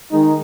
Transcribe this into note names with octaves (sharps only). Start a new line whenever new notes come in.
D#3 G#3 D#4